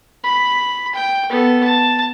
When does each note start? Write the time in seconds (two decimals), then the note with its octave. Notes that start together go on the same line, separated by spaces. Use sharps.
0.24 B5
0.95 G5
1.30 B3 A4
1.64 A5